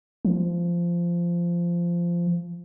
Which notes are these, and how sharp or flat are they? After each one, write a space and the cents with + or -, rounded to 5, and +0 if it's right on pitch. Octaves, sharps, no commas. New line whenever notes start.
F3 -15